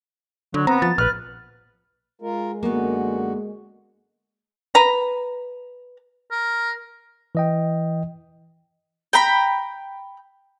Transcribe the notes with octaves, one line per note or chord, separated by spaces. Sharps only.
D3 F#3
B3 C4 A#5
F3 A6
A#1 B4 F6
G#3 F4 A#4
F#2 D3 A#3 B3 F#4
B4 A#5
A#4
E3 D#5 G5
G5 A#5 B5